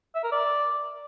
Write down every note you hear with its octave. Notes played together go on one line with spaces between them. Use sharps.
E5
A#4
D5